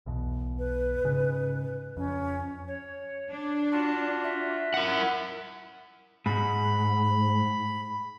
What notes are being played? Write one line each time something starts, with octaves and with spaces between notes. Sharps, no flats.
B1 E2 B2
B4
G#2 C#3
F2 C#4
C#5
D4
F4 F#4 A5
E5
E4 A#4 F#5
G#2 B5